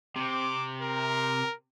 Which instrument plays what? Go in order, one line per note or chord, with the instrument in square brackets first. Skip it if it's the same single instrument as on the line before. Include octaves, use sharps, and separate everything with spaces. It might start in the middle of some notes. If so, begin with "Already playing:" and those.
[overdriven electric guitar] C3 [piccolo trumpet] D6
[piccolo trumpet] A#4